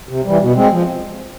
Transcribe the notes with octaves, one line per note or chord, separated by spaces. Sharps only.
C3
E3 G3
B2
G#3 C4
F3